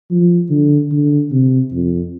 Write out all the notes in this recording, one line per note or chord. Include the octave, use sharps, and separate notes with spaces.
F3
D3
D3
C3
F2